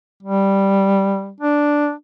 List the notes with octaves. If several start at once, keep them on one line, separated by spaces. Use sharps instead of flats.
G3
D4